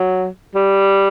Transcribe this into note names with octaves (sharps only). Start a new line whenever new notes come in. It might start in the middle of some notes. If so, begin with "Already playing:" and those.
Already playing: F#3
G3